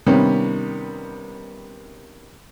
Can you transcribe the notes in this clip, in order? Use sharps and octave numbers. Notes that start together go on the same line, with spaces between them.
C3 D#3 G3 B3 C#4